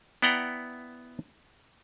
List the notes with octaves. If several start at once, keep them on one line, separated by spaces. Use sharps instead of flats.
B3 E4 D5 F#5 G5 A#5